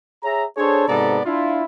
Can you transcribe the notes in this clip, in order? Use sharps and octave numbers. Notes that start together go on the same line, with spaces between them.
G#4 C#5 E5 A#5
D4 G#4 A4 C5 C#5
G#2 C3 B3 A4 D5 A#5
D4 E4 F4